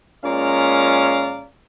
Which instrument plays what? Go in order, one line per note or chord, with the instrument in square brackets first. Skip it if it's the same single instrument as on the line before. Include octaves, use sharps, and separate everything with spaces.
[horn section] A#2 G#3 C#4 D5 F5 A#5